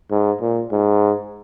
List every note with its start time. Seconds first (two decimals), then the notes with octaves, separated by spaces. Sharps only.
0.11 G#2
0.41 A#2
0.72 G#2